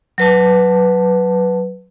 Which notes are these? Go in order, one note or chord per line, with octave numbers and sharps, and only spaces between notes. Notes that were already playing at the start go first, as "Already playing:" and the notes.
F#3 B4 A5